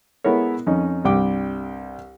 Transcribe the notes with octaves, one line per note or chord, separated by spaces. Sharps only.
G#3 B3 E4 A4 A#4 C#5
F2 C#4 D#4
C2 G2 G3 G5 D6